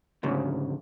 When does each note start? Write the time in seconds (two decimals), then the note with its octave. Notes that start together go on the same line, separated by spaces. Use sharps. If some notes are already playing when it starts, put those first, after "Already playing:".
0.23 D2 G#2 C#3